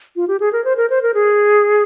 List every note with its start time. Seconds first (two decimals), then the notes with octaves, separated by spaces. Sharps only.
0.16 F4
0.28 G4
0.40 G#4
0.53 A#4
0.65 C5
0.77 A#4
0.90 C5
1.03 A#4
1.14 G#4